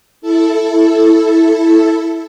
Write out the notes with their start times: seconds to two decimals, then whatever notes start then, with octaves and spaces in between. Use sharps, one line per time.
0.22 E4 A4